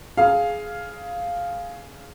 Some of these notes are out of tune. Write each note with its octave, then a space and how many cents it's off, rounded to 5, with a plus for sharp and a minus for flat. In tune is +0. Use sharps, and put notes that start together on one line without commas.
G#4 +10 F5 +0